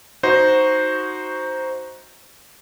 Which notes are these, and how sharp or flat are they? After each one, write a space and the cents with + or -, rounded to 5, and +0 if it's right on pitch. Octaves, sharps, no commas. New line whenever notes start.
D#4 +5 F#4 +0 C5 +0